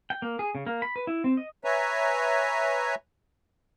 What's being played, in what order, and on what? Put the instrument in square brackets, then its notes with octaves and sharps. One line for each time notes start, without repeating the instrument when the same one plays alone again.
[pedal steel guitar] G5
A#3
G#4
C#3
A#3
B5
B4
E4
C4
D#5
[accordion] B4 C#5 E5 G#5 A#5